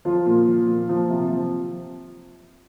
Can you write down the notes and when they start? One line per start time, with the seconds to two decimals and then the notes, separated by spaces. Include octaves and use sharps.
0.05 F3 F4
0.26 A#2
0.47 F3
0.68 A#2
0.89 F3
1.10 C3
1.31 F3